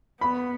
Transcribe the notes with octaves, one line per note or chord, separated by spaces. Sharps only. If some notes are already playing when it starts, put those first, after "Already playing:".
B3 B5